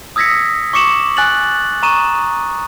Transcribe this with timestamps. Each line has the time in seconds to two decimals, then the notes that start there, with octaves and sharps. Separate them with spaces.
0.16 D#6 E6 G#6 A#6 B6 C#7
0.73 C#6 D6 C#7 E7 F#7
1.17 G#5 F#6 A6 F#7
1.83 A#5 C#6 D#6 D#7 E7